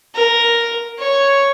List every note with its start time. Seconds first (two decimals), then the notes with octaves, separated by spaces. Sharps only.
0.15 A#4
0.99 C#5